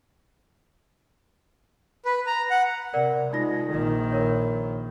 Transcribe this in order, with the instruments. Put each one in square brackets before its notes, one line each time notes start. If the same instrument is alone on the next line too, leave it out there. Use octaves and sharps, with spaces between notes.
[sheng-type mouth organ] B4
A#5
F#5
[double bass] C3 [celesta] A#4 D5 F#5
[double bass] G#3 [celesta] D#4 F4 A#6
[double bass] A#1 D#3
[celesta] A#4 C#5